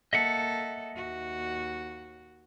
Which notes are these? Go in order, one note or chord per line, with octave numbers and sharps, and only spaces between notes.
A#3 A4 D#5 E5 F#5
D#2 F#4